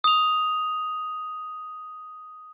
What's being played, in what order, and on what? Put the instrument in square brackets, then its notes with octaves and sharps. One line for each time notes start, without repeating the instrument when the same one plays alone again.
[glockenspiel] D#6 F7